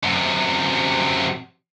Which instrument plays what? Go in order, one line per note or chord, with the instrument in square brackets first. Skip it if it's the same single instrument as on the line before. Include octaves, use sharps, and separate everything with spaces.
[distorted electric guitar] F#2 C3